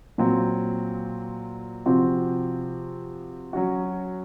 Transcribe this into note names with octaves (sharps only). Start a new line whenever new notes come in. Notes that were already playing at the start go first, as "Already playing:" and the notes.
A#2 F#3 C4
C3 F3 C4 F#4
F#3 C#4 F#4